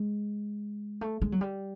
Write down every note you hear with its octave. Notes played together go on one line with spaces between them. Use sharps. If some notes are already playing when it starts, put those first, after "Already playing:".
Already playing: G#3
A3
G#3
F#3
G3